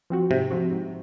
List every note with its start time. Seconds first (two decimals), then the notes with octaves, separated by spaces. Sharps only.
0.10 F3 C4 F#4
0.30 G#2 C3
0.51 F3 C4 F#4
0.71 G#2